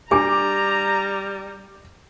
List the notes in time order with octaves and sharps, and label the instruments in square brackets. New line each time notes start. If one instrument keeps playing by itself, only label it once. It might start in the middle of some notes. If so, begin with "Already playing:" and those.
[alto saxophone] G3 [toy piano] D4 G4 G#5 [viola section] A#5 [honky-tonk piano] D6